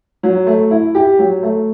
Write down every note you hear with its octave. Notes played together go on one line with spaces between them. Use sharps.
F#3
A3
E4
G4
F#3
A3